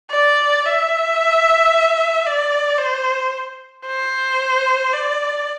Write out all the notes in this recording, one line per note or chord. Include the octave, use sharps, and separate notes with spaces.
D5
E5
D5
C5
C5
D5